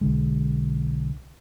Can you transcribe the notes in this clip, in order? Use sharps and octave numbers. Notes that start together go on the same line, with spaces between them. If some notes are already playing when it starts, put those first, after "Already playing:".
B1 D3 G#3